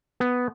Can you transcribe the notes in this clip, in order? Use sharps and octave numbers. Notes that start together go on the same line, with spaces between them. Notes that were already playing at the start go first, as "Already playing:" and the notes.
B3